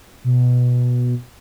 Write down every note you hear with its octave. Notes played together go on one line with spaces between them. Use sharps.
B2